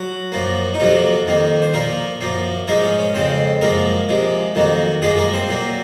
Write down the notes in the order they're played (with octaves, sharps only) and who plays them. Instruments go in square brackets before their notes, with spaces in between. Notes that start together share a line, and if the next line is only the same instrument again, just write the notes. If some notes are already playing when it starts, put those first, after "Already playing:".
Already playing: [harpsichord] F#3 F#4
F#2 F3 A#3
D#4
F2 C3 F3 F#3 A#3 F4
F2 D#3 A#3
C5
A#2 F3 A#3 A#4
F#2 F3 A#3
G#2 F3 G#3 A#3 A#4
C#4
C#4
F2 C#3 G#3 C4 C5
F#2 F3 G#3 A#3 A#4
C3 F3 G#3
F2 D#3 F#3 A#3
F#2 F3 G#3 A#3 G#4
A#3 A#4
C4 C5
A#2 F#3 A#3